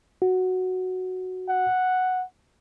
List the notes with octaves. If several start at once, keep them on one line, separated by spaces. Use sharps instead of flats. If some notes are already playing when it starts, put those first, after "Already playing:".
F#4
F#5